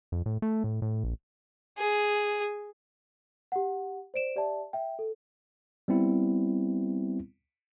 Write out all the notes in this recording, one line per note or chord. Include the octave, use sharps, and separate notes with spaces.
F2
A2
A3
A2
A2
A#1
G#4
G4 F#5
C5 D5 D7 E7
G4 D5 E5 A5
E5 G5
A4
G3 B3 C4 E4